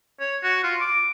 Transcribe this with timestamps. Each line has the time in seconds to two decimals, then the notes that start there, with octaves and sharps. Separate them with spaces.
0.20 C#5
0.43 F#4
0.64 F4
0.80 D6